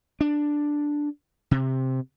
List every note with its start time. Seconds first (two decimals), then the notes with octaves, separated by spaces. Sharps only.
0.21 D4
1.51 C3